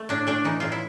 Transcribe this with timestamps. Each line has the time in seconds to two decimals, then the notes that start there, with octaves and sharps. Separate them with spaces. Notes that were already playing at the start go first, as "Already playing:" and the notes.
Already playing: A3
0.09 A2 D4
0.27 A3 D4
0.44 E3 D#4
0.60 A2 F4
0.72 E4